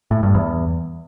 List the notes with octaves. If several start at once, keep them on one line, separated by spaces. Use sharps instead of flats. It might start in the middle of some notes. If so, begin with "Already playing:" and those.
A2
G2
E2